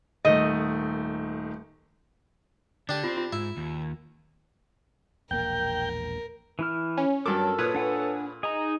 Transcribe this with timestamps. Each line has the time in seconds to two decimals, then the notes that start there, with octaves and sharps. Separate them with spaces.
0.25 D#1 D#3 A3 D#5
2.89 D3 D4 G4
3.04 C4 F4 C5
3.17 F4
3.33 G#2 E4
3.57 D#2
5.31 E1 A#1 A#3 A#4 G5 G6
6.59 E3 E4 F6
6.97 C#4
7.26 G2 F#3 A4 A#4 D6
7.59 A#2 B4 C#5 D#6
7.75 D4 F#5 G#5
8.43 D#4 G#4 A#5